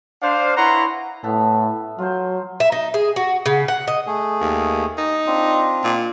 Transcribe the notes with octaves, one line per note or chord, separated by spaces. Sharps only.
D4 C5 F5
E4 B4 C#5 F#5 A#5 C6
A2 B3 E5 A5
F#3 F4 C5
E5
D#4
G#4
F#4
C#3
F#5
D#5
A3 G#4
D#2
D#4
C4 D4 F4
A#2